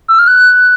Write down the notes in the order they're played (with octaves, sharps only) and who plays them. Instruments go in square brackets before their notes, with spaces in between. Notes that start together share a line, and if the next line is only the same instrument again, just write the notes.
[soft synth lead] E6
F6
F#6